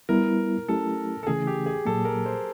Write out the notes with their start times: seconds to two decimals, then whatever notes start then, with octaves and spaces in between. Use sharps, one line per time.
0.09 G3 B3 E4 A#4
0.68 F#3 A3 C#4 E4 G4 A4
1.23 A4
1.27 C#3 E3 A3 C#4 E4 G#4
1.47 G4
1.66 G#4
1.85 A#2 F#3 A#3 A4
2.05 A#4
2.26 C5